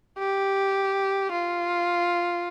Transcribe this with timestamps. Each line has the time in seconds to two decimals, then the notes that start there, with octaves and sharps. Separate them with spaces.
0.19 G4
1.32 F4